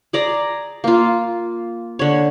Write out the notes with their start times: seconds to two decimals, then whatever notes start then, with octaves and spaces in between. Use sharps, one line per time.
0.13 G#4 D5 A#5
0.84 A#3 F4
1.99 D3 C#5